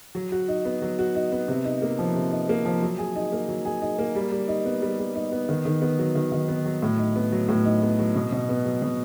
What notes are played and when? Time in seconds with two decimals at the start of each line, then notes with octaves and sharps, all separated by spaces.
0.15 F#3
0.32 F#4
0.48 D#4
0.65 B3
0.82 F#3
0.99 F#4
1.15 D#4
1.32 B3
1.48 C3
1.65 D#4
1.82 A#3
1.99 F3
2.15 C3
2.31 D#4
2.49 A#3
2.65 F3
2.82 F#3
2.99 G#4
3.16 D#4
3.32 A#3
3.49 F#3
3.65 G#4
3.82 D#4
3.99 A#3
4.15 G3
4.32 G3
4.48 D#4
4.65 B3
4.82 G3
4.99 G3
5.15 D#4
5.32 B3
5.49 D#3
5.65 D#3
5.82 B3
5.99 F#3
6.15 D#3
6.32 D#3
6.48 B3
6.66 F#3
6.82 A2
6.99 D#4
7.16 B3
7.32 F#3
7.49 A2
7.65 D#4
7.82 B3
7.99 F#3
8.15 B2
8.32 B2
8.49 B3
8.65 F#3
8.82 B2